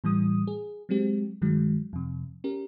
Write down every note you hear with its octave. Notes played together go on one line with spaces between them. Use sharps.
A2 E3 G3 D#6
G#4
F#3 G#3 C4 G4
G2 D#3 F#3 G#3
F2 C3
C#4 G4 A#4